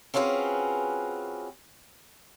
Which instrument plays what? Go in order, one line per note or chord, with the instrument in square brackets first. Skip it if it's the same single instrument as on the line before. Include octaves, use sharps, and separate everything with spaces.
[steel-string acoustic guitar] C4 C#4 F4 F#4 G#4 B4